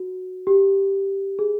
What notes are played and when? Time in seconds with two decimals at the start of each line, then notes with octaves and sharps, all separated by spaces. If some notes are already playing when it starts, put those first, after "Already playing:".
Already playing: F#4
0.47 G4
1.39 G#4